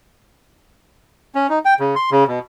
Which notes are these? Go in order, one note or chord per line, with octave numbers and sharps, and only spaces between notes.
C#4
D#4
G5
C#3
C6
C#3
B2